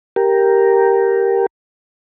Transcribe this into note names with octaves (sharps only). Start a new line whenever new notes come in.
G4 A#4